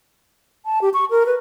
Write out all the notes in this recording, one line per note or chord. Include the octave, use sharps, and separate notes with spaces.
A5
G4
C#6
A#4
B4